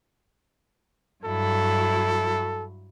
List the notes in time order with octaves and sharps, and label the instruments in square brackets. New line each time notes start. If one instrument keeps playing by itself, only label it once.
[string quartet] G2 F#3 E4 [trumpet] A4